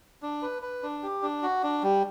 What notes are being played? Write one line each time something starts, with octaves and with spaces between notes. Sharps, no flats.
D4
B4
B4
D4
G4
D4
F#4
D4
G3